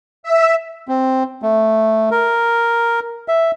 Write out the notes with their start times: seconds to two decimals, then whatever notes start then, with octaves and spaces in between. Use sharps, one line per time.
0.23 E5
0.88 C4
1.42 A3
2.11 A#4
3.28 E5